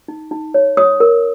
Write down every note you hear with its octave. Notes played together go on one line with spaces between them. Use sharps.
D#4
D#4
C#5
C#5 D#6
A#4